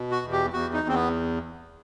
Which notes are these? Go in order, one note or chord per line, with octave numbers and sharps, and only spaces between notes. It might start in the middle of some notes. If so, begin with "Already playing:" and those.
Already playing: B2
F#4
E2
G4
E2 F#4
D#4
E2 C4
B3